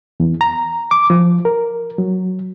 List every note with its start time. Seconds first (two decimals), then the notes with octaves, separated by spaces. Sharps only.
0.20 E2
0.41 A#5
0.91 D6
1.10 F3
1.45 A#4
1.98 F#3